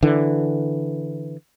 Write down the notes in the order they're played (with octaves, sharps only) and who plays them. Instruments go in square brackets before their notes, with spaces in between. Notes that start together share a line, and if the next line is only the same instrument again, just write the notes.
[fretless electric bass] D3 E3